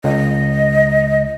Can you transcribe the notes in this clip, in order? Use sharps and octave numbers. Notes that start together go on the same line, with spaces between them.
C#2 D#5